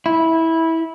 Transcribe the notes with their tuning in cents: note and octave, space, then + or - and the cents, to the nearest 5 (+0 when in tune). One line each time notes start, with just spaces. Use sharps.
E4 -15